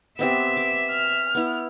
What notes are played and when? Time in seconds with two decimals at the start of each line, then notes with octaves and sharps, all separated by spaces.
0.19 B3 C4 G4 E5
0.57 D6
0.91 F6
1.35 B3 E4